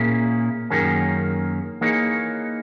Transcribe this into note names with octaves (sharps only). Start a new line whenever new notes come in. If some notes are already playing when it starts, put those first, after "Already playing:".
Already playing: A#2 A#3 C#4 E4 G#4
F#2 D#3 A#3 C#4 G#4
E3 A#3 D#4 G#4 C#5